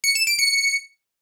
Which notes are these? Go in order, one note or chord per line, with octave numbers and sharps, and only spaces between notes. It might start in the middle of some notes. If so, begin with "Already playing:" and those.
C#7
E7
D7
C#7